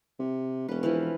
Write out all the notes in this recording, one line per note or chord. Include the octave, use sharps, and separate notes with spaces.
C3
E1 C#4 B4
E3 F3 B3